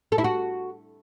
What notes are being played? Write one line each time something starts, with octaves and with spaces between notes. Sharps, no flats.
A4
E4
F#4